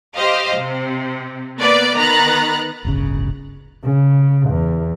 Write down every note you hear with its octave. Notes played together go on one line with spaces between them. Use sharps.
G4 C5 D#5 F5
C3
A#3 B3 B4 D5
D#3 B3 A#5 B5 F#6 A6
D1 G1 C#3
C#3
E2